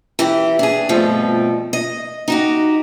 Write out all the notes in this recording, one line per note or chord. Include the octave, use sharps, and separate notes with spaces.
E3 G4
D4 G#4
G2 B2 F3 A3 C4
D#5
D#4 F#4 G4